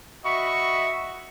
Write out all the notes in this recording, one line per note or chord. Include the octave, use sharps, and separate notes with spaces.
F#4 D#5 E5 B5 C#6